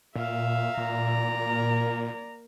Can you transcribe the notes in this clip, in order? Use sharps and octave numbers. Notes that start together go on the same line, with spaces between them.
A#2 E5 F5
A#2 D5 A#5
A#3 A#4